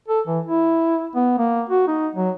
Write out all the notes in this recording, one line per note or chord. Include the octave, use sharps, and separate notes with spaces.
A4
E3
E4
B3
A#3
F#4
D#4
F#3